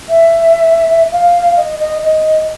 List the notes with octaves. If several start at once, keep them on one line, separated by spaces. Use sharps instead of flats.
E5
F5
D#5
D#5
D#5